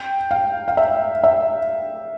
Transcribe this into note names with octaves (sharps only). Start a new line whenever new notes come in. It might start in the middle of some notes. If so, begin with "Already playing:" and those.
Already playing: G5
F5
F5
E5
E5